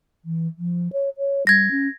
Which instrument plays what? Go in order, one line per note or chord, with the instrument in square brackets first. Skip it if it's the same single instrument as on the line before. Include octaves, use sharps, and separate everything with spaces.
[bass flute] E3
F3
C#5
C#5
[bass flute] G3 [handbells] G#6 A#6
[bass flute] C#4